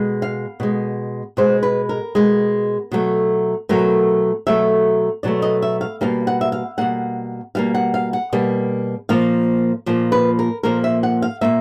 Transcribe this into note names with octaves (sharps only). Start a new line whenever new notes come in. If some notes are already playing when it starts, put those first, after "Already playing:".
Already playing: B2 G#3
F5
B2 G#3
B2 G#3 C5
B4
A#4
B2 G#3
B2 F#3 A3
B2 F#3 A3 A#4
B2 F#3 A3 E5
B2 F#3 A3 D5
D#5
E5
F5
B2 G3 A#3 F5
F#5
E5
F5
B2 G3 A#3 F#5
B2 G3 A#3 F5
F#5
F5
F#5
B2 G3 A#3
A#2 F3 A#3 F5
A#2 F3 A#3
B4
A#4
A#2 F3 A#3 A#4
E5
F#5
F5
A#2 F3 A#3 E5